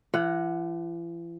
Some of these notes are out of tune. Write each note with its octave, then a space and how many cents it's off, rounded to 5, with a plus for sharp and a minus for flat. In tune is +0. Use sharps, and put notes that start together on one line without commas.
E3 +45 F#5 +0